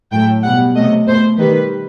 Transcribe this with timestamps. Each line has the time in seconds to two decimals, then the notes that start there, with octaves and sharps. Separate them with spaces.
0.12 A2 F#3 A3 G5
0.43 B2 G3 F#5
0.75 C3 F#3 A3 D#5
1.07 B2 A3 C5
1.38 D#3 G3 B4